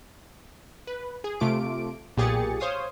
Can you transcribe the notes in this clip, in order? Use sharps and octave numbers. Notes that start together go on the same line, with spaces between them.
B4
G#4
C3 A3 F4 D6 D7
B1 A#2 G4 G#4 A6 C#7
C5 C#5 F5 D#6